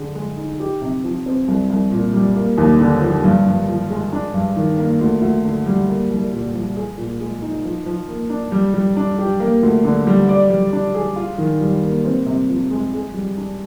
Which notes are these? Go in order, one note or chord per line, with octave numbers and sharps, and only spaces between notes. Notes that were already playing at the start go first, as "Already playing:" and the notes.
Already playing: D3 G#4
G#3
D#4
G4
C3
F3
C4
C2
C2
A#2
G3
A#3
D#2
D3
F3
G2
G2
F3
G#3
D4
G2
D#3
A#3
D2
D2
D3
G3
A#3
C2
A#2
F3
G#4
A#2
G#3
D#4
F3
F3
A#3
D4
G3
G3
D4
G4
A#3
D2
D3
G3
D5
G3
D4
G#4
F4
D#3
G3
A#3
C4
C3
F3
G#3
G#4
G3
D4